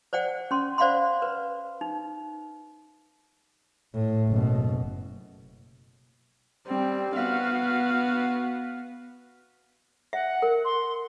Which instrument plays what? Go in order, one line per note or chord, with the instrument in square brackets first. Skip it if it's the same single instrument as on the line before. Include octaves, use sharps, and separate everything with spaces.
[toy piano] C5 D5 F#5 G5
C#4 C6
C5 D5 F5 F#5 B5 C6
B4
D#4
[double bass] A2
F#1 B2
[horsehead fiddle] G3 C4
[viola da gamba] B3 [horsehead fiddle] F#4 F5
[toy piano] E5 [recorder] F#5
[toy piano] A#4
[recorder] C6